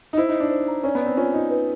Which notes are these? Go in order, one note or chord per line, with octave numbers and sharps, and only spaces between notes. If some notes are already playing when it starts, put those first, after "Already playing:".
D#4
E4 C5
D#4
C5
D4
C5
A#5
C#4 D5
B3
C4 D5
C#4 F4
D#4 F4
B4